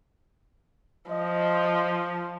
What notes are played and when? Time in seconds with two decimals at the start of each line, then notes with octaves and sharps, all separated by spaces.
1.10 F3 D#5